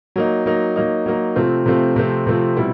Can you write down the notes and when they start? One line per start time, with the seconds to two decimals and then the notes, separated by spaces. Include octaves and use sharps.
0.16 F#3 A#3 D#4
0.46 F#3 A#3 D#4
0.76 F#3 A#3 D#4
1.06 F#3 A#3 D#4
1.36 C3 F3 A3 C4 F4
1.66 C3 F3 A3 C4 F4
1.96 C3 F3 A3 C4 F4
2.27 C3 F3 A3 C4 F4
2.57 B2 G3 C4 E4